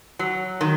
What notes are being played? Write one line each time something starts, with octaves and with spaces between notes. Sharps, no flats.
F#3
D#3